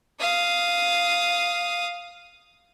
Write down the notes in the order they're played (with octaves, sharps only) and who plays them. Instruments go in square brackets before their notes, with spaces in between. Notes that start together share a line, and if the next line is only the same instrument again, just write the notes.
[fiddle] F5 D#6